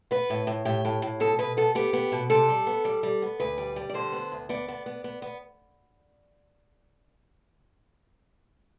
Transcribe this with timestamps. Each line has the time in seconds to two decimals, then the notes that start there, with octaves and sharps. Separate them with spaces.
0.11 B3 B4
0.30 A2
0.47 A2
0.65 A2 G4
0.85 A2
1.02 A2
1.20 B2 A4
1.39 B2 B4
1.57 B3 A4
1.75 B3 G4
1.93 B3
2.12 B2
2.30 C3 A4
2.49 G3
2.67 B3
2.85 G3
3.03 G3
3.22 B3
3.40 D2 B4
3.58 G3
3.76 G3
3.90 D5
3.94 D3 C5
4.12 B3
4.32 D2
4.49 B3 D5
4.68 B3
4.86 B3
5.04 B3
5.22 B3